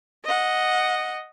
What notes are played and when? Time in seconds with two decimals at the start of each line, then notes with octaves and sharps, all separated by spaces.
0.25 D#5 F#5